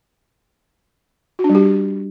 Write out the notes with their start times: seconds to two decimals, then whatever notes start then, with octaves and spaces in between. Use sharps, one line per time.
1.39 F#4
1.44 D4
1.50 G3
1.55 G4